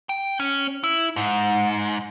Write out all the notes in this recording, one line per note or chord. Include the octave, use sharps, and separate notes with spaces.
G5
C#4
E4
G#2